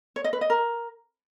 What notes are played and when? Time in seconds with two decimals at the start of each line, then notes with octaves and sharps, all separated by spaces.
0.16 C#5
0.24 D#5
0.33 B4
0.41 D#5
0.50 A#4